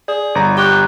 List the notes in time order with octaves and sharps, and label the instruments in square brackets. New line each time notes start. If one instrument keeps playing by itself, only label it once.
[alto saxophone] G#4 [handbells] D5
[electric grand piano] G1 A#5
[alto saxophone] G4 [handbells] C#6 F#6